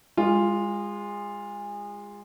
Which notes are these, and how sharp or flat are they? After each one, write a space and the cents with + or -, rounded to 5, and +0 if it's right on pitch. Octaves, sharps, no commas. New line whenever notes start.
G#3 -25 F4 +0